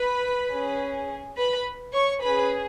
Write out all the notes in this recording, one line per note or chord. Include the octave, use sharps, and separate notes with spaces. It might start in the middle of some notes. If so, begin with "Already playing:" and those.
Already playing: B4 B5
C#4 G#4
B4 B5
C#5 C#6
C#4 G#4 B4 B5